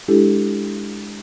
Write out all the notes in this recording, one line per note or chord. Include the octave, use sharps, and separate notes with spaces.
G#3 D4 E4 G4 A4